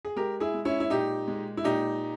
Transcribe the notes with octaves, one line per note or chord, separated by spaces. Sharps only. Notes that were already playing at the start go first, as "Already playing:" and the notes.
G#4
G#3 G4 A#4
E4 G#4
G#3
C#4 E4
E4
A#2 D#4 G4
G#3
E4
A#2 D#4 G4